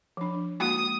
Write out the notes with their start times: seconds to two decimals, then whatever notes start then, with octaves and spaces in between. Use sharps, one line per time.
0.17 F3 D4
0.60 G#3 A#3 F#4 D#6